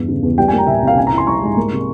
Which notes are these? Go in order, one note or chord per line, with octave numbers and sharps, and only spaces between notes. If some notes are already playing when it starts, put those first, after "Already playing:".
Already playing: E2 G2 E3
C#3
E2
G3 G5
A#3 G#5
A#5
A#2 E5
C2
F5
C#4 G#5
E4 A#5
C6
G3 C#6
G#2
A#3
C3